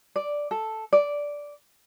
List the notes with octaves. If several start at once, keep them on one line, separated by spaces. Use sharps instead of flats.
D5
A4
D5